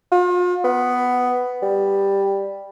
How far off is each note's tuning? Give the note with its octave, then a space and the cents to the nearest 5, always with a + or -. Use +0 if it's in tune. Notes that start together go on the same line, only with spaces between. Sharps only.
F4 +40
B3 +10
G3 +5